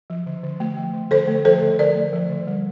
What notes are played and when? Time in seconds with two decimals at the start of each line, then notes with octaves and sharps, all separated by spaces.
0.10 F3
0.27 D3
0.44 D3
0.60 A3
0.77 F3
0.94 D3
1.11 D3 A4 C5
1.28 A3
1.45 F3 A4 C5
1.62 D3
1.79 D3 A#4 D5
1.95 A3
2.13 F3
2.30 D3
2.47 G3